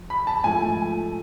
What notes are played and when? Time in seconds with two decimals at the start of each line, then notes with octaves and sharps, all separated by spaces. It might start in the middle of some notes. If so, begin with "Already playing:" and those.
Already playing: F2
0.10 B5
0.27 A5
0.44 G#2 F3 A3 G#5